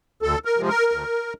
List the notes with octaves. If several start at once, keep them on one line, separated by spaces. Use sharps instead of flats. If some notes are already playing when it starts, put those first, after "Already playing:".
D2 A4
A#4
C3 F3 G#3
A#4
D2